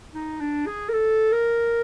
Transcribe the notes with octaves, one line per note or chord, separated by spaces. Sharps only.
D#4
D4
G#4
A#4
A4
A#4